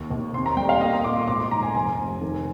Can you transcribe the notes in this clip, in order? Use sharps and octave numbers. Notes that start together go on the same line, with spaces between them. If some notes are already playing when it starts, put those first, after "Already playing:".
Already playing: D#2
D#2
C4 C6
A#5
G3 G5
F5
A#3 D#5
C6
A#2 D6
C6
G#1 D6
C6
G#2 A#5
G#5
F1 G#5
F1
D#3